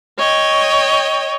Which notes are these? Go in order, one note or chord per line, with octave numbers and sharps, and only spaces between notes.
C#5 D#5 G5